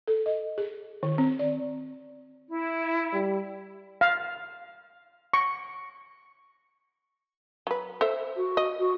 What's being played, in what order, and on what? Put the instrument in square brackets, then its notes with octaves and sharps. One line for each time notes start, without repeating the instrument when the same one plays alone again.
[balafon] A4
D#5
G#4
D#3
C4
D5
[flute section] E4
[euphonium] G3
[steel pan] F5
C#6
[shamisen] F#3 B4
A4 C5 E5
[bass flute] F#4
[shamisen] D#5
[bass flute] F#4